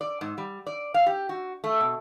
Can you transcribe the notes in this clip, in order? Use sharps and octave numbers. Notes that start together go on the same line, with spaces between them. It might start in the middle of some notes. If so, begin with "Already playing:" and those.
D5
G#2
G3
D5
F5
G4
F#4
A3
B2